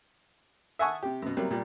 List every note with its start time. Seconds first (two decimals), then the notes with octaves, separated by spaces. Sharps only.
0.79 E5 F#5 G#5 A5 C#6 D#6
1.03 C3 G4
1.22 F#2 B2
1.37 C3 F#3 G3 A#3
1.51 A#2 G3